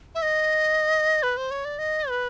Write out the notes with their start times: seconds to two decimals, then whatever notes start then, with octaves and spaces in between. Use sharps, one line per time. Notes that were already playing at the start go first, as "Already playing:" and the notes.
0.15 E5
0.22 D#5
1.23 B4
1.37 C5
1.51 C#5
1.65 D5
1.79 D#5
2.10 B4